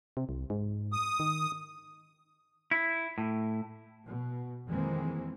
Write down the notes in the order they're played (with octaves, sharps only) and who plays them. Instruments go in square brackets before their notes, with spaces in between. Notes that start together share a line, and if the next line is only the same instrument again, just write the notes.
[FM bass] C3
C2
G#2
[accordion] D#6
[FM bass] D#3
[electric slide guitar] E4
A2
[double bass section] B2
F2 D#3 E3 G#3 A#3 C4